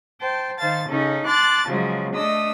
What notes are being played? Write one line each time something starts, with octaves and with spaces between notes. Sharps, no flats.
C5 G5 A5
D#3 C5 F5 A5 A6
C#3 C#4 D#4 A4
A5 C6 D6 F#6 A6
C#3 F3 F#3 G#3
A3 D4 D#5 D#6 E6